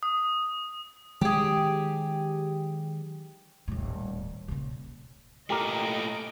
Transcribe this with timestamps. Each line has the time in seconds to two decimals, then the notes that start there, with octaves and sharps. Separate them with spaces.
0.03 D#6
1.21 D#3 F#3 G#3 G4 G#4
3.68 D#1 A2
4.48 A#2 C#3
5.50 A#2 A3 G4 A#4 D#5 D7